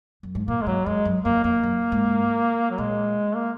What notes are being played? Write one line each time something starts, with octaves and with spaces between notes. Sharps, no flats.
F#2
G#2
A#2 A#3
G#3
G#2 F#3
F#2 G#3
F#2
F#2 A#3
F2 A#3
F#2
G#2
F#3
A#2 G#3
A#3